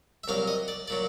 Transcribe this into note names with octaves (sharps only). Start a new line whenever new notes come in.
E5
C2 A#2 F#3 F5
D#5
D5
A#2 F#3 D5